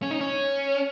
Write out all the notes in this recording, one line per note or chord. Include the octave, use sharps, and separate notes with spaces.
C#4
D#4
C#4